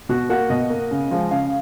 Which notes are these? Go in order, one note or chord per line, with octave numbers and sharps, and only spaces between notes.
B2 F#4 F#5
A#3 F#4 F#5
B2 D#5
A#3
C#3
F3 G#3
C#3 F5